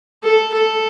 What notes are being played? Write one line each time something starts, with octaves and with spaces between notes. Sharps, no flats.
A4
A4